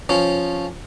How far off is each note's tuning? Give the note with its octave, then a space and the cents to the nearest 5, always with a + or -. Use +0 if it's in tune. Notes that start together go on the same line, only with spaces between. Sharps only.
F3 +0 C#4 +0